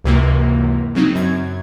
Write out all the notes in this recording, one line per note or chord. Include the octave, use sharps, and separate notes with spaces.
C#2 F#2 C3 E3 A#3
C#3 F#3 C4 D#4
F#2 G#6